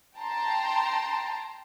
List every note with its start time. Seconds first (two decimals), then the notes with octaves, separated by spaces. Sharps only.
0.18 G5 A5 A#5 C6